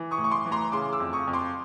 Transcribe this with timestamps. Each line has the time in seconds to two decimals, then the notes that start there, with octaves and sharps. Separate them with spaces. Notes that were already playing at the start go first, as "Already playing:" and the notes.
Already playing: E3
0.11 C#6 D#6
0.18 A2
0.24 C#6
0.31 C6 D6
0.46 E3
0.52 A#5 C6
0.72 C#3 C6 D6
0.93 D6 E6
1.00 F2
1.13 C#6 D#6
1.27 F2
1.33 C6 D6